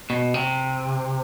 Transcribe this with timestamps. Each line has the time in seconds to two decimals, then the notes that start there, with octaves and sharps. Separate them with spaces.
0.10 B2
0.34 C3